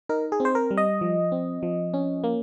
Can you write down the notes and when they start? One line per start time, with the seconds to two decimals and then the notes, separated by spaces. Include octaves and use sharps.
0.09 D#4 A#4
0.32 G#4
0.40 C4
0.45 C5
0.55 A#4
0.71 G3
0.77 D#5
1.01 F3
1.32 C4
1.63 F3
1.94 C#4
2.24 A#3